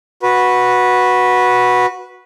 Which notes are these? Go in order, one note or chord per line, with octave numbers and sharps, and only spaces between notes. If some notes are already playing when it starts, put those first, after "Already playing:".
F#4 B4